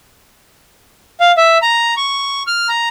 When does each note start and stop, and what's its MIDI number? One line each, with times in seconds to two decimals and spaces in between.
1.20 1.32 77
1.37 1.58 76
1.62 1.94 82
1.97 2.43 85
2.47 2.68 89
2.69 2.89 82